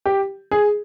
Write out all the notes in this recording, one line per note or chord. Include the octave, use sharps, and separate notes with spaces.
G4
G#4